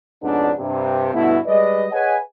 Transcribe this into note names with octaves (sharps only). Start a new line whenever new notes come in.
F2 G#2 B2 B3 C#4 D4
G2 C3
G2 B2 D3 A3 B3 E4
G3 G#3 B4 D5 D#5
G#4 B4 C#5 D#5 F#5 G#5